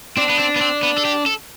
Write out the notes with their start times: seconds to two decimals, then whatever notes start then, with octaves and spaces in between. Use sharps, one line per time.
0.17 C4 D4
0.29 B3
0.39 C4
0.56 B3
0.61 C4
0.83 B3
0.98 A4
1.05 G4
1.26 A4